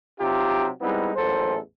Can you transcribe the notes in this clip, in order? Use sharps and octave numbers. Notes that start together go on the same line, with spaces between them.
C3 F#3 D#4 F4 G4
G3 G#3 B3 C4 D#4 E4
A1 E2 A#2 F#3 A4 C5